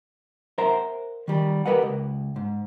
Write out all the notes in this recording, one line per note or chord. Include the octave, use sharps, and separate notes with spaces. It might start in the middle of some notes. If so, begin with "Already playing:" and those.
A#4 C5 E5 F#5 A#5
D#3 G3
G4 A#4 B4 D#5 F#5
C#2
G#2